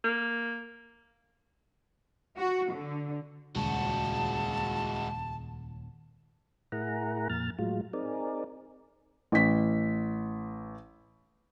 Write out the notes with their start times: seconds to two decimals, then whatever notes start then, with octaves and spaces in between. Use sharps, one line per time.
0.04 A#3
2.37 F#4
2.71 D3
3.56 D#1 C#2 G#3 F#4 A5
6.72 A2 E4 G#4 A#4 F#5 A#5
7.29 F2 A#2 F6 A6
7.59 A2 F#3 G#3 F4
7.93 C4 D#4 G#4 A#4 D5
9.32 A1 B6